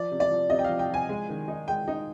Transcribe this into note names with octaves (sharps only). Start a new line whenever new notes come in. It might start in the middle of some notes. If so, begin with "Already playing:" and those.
Already playing: F3 D5
C3
D5
F3
C3 D#5
G5
F3 F5
G5
F3 G#5
G#3
D#3
D#4
G#3 G5
D#4